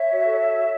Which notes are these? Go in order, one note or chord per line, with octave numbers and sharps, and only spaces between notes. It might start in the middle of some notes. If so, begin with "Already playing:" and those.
Already playing: C#5 E5
F#4
A4
C#5
F#4